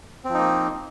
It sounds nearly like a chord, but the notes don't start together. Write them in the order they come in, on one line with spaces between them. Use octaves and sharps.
C4 F3 D#4 A#3